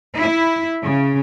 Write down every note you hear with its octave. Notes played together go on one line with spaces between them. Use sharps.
E4
C#3